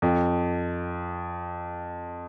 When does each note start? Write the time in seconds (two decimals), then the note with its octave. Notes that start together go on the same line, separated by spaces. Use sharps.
0.02 F2